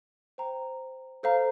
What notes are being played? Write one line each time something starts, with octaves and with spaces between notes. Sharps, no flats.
C5 G5 A#5
A4 C5 F5 A#5 F6